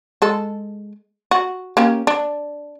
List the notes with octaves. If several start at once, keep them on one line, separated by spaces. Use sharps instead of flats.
G#3 A4
F#4
A#3 C#4 G4
D4